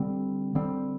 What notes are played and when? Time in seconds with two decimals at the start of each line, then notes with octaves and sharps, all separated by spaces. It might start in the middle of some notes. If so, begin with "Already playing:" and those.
Already playing: D3 G3 C4
0.55 D3 G3 C4